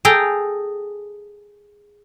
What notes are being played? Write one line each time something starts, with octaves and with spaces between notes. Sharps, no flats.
G#4 A4 G5 A#5